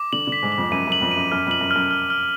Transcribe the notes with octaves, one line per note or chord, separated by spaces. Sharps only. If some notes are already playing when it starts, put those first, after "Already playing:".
Already playing: D6
D3 F#7
D3 B6
G#2
F#7
F2
F#2 D#7
F#2 F#7
F2
F#2 D#7
F#2 F6
F2 F#7
F#2
F#2 F6
F6
F6